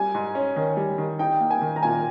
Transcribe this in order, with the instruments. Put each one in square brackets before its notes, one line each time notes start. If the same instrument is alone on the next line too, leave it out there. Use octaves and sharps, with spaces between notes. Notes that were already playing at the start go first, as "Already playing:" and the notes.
Already playing: [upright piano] G3 [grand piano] G#5
[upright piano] G#2
C#4
D#3
G3
D#3
[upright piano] D#4 [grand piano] G5
[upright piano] A#3
[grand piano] G#5
[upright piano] D#3
[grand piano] A#5
[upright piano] A#2 [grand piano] G#5